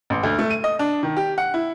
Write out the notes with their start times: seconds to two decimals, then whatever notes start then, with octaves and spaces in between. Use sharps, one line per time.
0.10 A1
0.23 D2
0.39 A3
0.50 D#7
0.64 D#5
0.79 D4
1.03 D#3
1.17 G4
1.38 F#5
1.54 E4